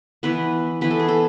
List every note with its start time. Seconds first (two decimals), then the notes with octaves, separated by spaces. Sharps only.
0.23 E3 B3 B4
0.81 E3 B3 B4
0.91 A4
0.99 G#4
1.08 A4